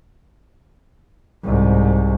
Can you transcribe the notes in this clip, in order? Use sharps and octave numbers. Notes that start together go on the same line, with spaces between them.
C2 G#2